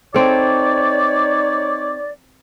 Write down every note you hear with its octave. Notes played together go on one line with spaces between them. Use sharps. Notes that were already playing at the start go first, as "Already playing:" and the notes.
C4 D#4 A4 C#5 D5